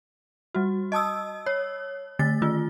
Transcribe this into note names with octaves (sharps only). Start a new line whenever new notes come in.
G3 F#4
D#5 A5 D#6 E6
C#5
D3 A3 A6
D#3 F4